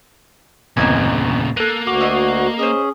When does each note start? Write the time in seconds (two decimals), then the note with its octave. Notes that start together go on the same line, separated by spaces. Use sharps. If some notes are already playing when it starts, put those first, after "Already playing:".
0.77 G1 E2 A#2 C#3 A#3 C4 D#5 G#5
1.57 A#3 A4 F#6 D#7
1.87 D2 F#4 D6
2.01 A3 D#5
2.59 C#4 G#4 C5 D#5